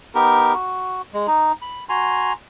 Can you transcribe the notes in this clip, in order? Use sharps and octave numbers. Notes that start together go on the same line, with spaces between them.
B3 D#4 G4 A#4
F#4
G#3
D#4
B5
F#4 G#5 A#5 C6